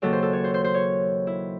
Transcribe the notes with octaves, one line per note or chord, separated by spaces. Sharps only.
D#2 C#3 F#3 A4
C5
A4
C#5
C5
C5
C5
C#5
E4